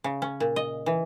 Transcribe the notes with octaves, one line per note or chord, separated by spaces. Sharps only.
C#3
C#4
A#2
D#5
E3